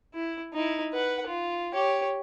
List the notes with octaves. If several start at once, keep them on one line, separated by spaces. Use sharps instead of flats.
E4
D#4 E4
B4 F#5
F4
G4 C#5